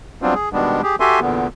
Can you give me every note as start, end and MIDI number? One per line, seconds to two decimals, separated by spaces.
0.22 0.34 54
0.22 0.34 55
0.22 0.34 59
0.22 0.34 60
0.22 0.34 62
0.22 0.34 65
0.34 0.49 68
0.53 0.81 47
0.53 0.81 51
0.53 0.81 55
0.53 0.81 56
0.53 0.81 59
0.53 0.81 62
0.83 0.96 67
0.83 0.96 68
1.00 1.20 66
1.00 1.20 67
1.00 1.20 69
1.00 1.20 76
1.00 1.20 80
1.00 1.20 84
1.21 1.47 40
1.21 1.47 46
1.21 1.47 50
1.21 1.47 59